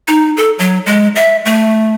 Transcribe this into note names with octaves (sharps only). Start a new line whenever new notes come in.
D#4
A4
F#3
G#3
E5
A3